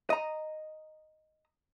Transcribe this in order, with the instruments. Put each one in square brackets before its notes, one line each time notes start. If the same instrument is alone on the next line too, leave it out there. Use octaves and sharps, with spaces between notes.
[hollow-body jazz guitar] D#5 A#5